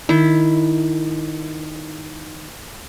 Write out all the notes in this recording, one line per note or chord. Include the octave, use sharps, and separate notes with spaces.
D#3 E4